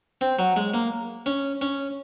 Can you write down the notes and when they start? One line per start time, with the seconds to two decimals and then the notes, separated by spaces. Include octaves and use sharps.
0.21 C4
0.39 F#3
0.56 G#3
0.74 A#3
1.26 C#4
1.61 C#4